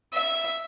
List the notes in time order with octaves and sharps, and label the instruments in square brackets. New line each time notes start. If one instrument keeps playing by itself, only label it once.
[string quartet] E5